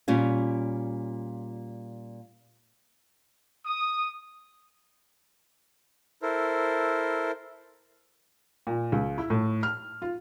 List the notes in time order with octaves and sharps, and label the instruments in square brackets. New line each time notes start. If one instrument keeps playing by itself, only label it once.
[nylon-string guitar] A#2 G3 C#4 F4
[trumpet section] D#6
[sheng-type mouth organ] E4 A4 A#4 C5
[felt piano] A#2
C#2
E4
A2
F6
F4